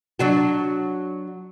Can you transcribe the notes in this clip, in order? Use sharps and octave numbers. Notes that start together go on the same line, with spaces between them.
F#3 D4 F#4